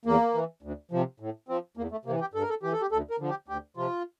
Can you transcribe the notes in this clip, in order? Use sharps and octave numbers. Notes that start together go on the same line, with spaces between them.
E2 A#3
E3
D2
C3 F3
A2
F3 C4
E2 A#3
A3
C3 E3 A#3
G4
G2 A4
A#4
A4
E3 G4
A4
G4
D2 A4
A#4
D3 F3
G4
D2 G4
C3 F3 F4